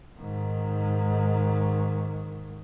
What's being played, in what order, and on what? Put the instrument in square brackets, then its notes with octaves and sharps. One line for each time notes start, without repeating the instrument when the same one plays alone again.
[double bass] G#2 D#3